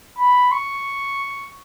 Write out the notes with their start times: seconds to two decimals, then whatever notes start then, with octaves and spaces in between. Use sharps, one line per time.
0.19 B5
0.51 C#6